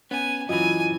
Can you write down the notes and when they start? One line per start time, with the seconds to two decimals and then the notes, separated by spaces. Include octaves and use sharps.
0.11 B3 C#4 G#5
0.49 F#2 E3 F4 F#4 D#5 G#5